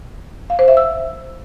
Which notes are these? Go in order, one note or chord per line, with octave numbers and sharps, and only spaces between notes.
F5
C5
E5
E6